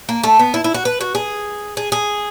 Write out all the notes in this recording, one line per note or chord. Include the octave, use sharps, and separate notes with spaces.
A#3
A3
B3
E4
E4
F#4
B4
F#4
G#4
G#4
G#4